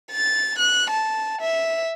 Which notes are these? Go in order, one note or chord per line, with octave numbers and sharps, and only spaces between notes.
A6
F#6
A5
E5